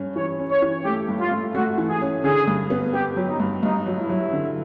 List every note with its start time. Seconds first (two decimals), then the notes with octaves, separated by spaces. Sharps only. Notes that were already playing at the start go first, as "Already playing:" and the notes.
Already playing: G2 C#4
0.16 E3 C#5
0.39 C#4
0.50 C#5
0.62 E3
0.85 A3 G4
1.08 G2
1.20 F4
1.31 A3
1.55 A3 F#4
1.78 E3
1.89 G#4
2.01 C#4
2.24 D3 G#4
2.47 G2
2.70 B3
2.93 B3 G4
3.16 F#3
3.28 D#4
3.40 G2
3.63 G2 D#4
3.86 F#3
3.98 E4
4.10 F#3
4.32 D3